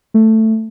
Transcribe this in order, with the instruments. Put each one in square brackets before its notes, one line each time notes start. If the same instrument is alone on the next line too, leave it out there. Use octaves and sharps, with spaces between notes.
[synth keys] A3